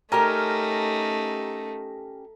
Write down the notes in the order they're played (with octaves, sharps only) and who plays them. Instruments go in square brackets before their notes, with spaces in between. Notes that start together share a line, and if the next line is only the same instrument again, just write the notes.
[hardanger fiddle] A3 D#4 [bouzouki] C#4 G4 A#4 [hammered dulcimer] A#5